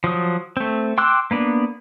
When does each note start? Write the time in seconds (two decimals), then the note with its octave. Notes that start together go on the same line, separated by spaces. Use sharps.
0.04 F3 F#3 D#6
0.57 A3 C4
0.98 G5 C6 D6 E6 F#6
1.31 A#3 B3 D4